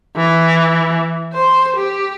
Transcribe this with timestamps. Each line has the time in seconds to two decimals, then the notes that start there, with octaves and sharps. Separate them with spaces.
0.17 E3
1.33 C5
1.76 G4